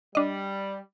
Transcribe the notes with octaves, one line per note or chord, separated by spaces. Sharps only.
G3 D4 D#5